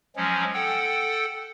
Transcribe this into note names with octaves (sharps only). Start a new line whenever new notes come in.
F3 F#3 G#3 C#4
A4 F#5 G5